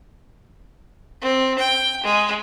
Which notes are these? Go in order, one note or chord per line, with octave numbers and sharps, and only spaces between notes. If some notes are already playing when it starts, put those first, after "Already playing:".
C4
G5
G#3